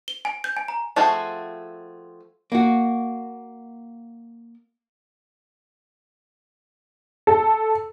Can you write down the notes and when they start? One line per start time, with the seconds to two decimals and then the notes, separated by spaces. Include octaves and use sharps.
0.08 G7
0.25 G#5
0.44 G6
0.57 G#5
0.68 A#5
0.96 F3 A3 C4 F#4 G#4
2.52 A#3 F#4
7.27 A4